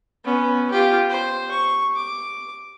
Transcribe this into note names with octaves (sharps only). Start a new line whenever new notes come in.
B3 C#4
F4 G4
C5
C#6
D6